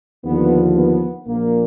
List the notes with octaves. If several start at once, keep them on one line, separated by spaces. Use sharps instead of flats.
D#2 D3 F3 B3
B3
A#1 A#2 F3 A#3